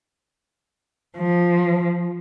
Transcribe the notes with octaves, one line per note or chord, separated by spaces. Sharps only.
F3